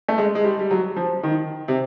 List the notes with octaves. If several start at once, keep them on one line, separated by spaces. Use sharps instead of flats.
A3
G#3
G#3
G3
G3
F#3
F3
D#3
C3